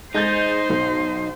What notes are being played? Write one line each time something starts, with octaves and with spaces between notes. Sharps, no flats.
G#3 D#4 C5 G6 A6
B1